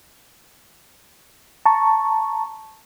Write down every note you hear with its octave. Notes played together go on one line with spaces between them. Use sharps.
A5 A#5 C#6